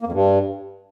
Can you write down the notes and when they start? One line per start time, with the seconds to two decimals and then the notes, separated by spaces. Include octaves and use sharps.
0.01 A#3
0.07 F2
0.12 G2